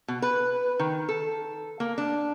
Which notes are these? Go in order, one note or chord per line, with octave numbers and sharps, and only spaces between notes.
B2
B4
D#3
A4
A#3
D4